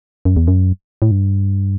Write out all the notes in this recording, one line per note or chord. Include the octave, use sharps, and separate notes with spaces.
F#2
E2
F#2
A2
G2